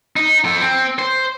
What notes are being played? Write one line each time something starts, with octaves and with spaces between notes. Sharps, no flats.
D#4
F3 A4
C4
C5